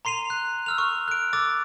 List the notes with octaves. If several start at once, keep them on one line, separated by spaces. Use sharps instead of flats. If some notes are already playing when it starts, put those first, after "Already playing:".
A#5 C6 C7 D#7 F7
F#6
E6 F6 F7
C#6 F6
F#6 D7
D6 E6 A6